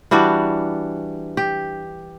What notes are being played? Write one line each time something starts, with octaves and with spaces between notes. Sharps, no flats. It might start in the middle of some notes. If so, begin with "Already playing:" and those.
E3 G3 D4 F#4
G4